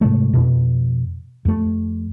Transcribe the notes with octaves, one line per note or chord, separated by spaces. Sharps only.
G#2 C3 G#3 A3
F2 B2
F2 A3